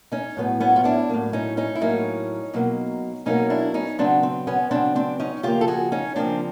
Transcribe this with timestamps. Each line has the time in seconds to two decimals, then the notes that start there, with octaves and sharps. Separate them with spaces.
0.12 C#4 D#4
0.37 A2 F#3 B3
0.60 B3 C#4
0.76 F4
0.84 D4 E4
1.09 A2 F#3 A#3
1.33 C#4 D#4
1.57 C#4 D#4
1.75 E4
1.81 A2 F#3 A#3 C#4 D#4
2.54 B2 F#3 A#3
3.26 B2 F#3 A#3 C#4 D#4
3.50 D4 E4
3.74 C#4 D#4
3.98 C#3 F#3 B3 C4 D4
4.23 C4
4.47 B3 C#4
4.71 C#3 F#3 B3 C4 D4
4.95 C4 D4
5.19 C#4 D#4
5.43 C#3 F3 A#3 F4 G4
5.61 A4
5.68 F#4 G#4
5.92 C#4 D#4
6.15 C#3 F3 A#3 C4 D4